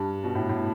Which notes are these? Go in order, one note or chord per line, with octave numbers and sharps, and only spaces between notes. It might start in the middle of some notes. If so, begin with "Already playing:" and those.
Already playing: G2
B2
A2
A2